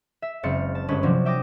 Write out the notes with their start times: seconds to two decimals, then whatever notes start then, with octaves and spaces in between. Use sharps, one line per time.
0.22 E5
0.43 F#1 G#3 C4 F5 A6 C#7
0.75 A5
0.88 G1 G#3 C#4 B4
1.03 C3 F3 F#3 C4 D4
1.25 E5 G5 D6 D#6 A#6